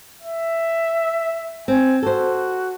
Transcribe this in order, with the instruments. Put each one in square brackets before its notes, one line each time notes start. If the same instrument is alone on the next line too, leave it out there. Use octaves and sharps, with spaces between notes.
[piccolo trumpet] E5
[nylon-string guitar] C4 [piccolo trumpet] G#5
[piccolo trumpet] F#4 [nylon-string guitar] A4 C5